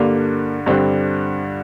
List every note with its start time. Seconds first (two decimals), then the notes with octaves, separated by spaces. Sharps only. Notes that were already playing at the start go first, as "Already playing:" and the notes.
Already playing: G2 D3 G3 A#3
0.66 G2 D3 G3 C4